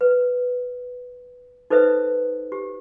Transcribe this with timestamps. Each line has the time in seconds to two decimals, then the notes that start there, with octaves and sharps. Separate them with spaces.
0.01 B4
1.70 D#4 A4 B4 C5 E5
2.52 G4